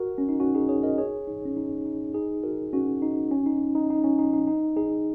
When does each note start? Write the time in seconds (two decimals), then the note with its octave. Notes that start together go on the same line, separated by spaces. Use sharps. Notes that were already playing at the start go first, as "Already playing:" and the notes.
Already playing: F#4 A#4
0.18 C#4
0.29 D#4
0.40 C#4 F#4
0.55 D#4 G#4
0.69 G#4 C#5
0.83 A#4 D#5
0.98 G#4 C#5
1.27 D#4
1.46 C#4
1.57 D#4
1.85 D#4
2.14 D#4 G#4
2.44 F#4 A#4
2.73 C#4 F#4
3.02 D#4
3.31 C#4
3.46 D#4
3.75 D#4
3.90 D#4
4.04 C#4
4.19 D#4
4.33 D#4
4.47 D#4
4.77 D#4 G#4